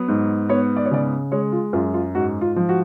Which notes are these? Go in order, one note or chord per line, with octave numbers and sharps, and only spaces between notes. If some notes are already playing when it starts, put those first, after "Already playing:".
Already playing: F#3 B3
G#2
B3 C#5
D5
C#5
C#3 D5
G#3 C#5
F4
F#2 F4
F4
G#2 F#4
F4
F3
F#4